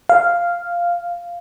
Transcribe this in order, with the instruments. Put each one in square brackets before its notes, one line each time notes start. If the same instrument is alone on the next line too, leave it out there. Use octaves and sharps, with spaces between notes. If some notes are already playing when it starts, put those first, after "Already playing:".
[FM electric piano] F5